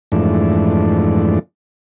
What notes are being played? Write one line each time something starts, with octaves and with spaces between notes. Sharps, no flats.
F2 G#2 E3 A3 D4